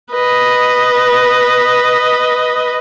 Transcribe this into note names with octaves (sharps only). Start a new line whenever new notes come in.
B4 D#5